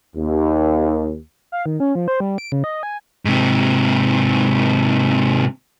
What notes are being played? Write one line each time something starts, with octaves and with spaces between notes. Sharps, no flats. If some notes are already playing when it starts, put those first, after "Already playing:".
D#2
F5
D#3
C#4
F3
C5
G3
D7
C#3
D#5
G#5
G#2 C3